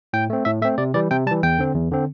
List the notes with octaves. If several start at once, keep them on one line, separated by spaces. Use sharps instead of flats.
A2 G5
A3 C4
A2 E5
A3 C4 E5
C3 D5
E3 G3 D5
C3 G5
E3 G3 A5
E2 G5
D3 C4
E2
D3 C4